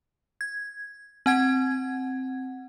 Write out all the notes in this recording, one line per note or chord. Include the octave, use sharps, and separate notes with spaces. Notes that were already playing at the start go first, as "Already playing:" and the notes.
G#6
C4 F#5 G#6